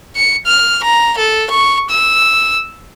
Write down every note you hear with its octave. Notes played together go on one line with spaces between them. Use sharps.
C#7
F6
A#5
A4
C#6
E6